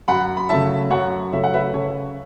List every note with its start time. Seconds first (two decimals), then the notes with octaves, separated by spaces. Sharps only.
0.08 F#2 F#5 B5
0.37 B5
0.49 C#3 F#3 A3 C#4 E5 A5
0.90 F#2 C#5 F#5
1.33 C#3 F#3 A3 C#4 E5
1.44 F#5
1.54 B4 E5
1.73 C#3 A4 C#5